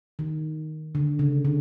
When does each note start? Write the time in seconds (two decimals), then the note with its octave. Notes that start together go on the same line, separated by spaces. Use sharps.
0.19 D#3
0.95 D3
1.19 C#3
1.45 D3